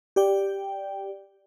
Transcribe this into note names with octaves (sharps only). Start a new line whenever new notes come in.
G4 D5 G5